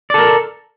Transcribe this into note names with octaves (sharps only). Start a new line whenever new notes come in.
A4 A#4 D5